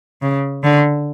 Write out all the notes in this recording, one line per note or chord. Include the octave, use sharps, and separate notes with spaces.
C#3
D3